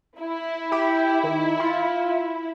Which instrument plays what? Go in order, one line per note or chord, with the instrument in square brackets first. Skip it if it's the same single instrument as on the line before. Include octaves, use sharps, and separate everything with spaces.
[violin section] E4
[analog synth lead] G4
D#3
F4